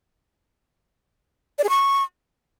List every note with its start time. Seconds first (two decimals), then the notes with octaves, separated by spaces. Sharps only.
1.58 D5
1.64 G#4
1.69 C#6